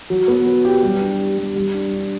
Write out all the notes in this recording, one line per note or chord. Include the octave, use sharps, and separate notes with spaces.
F#3
B3
F#3
G4
G3
D4
G4
G3
G3
D4
D4